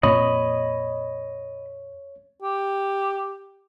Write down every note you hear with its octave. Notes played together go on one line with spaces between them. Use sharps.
F2 A#2 A#3 C#5 D#5 B5
G4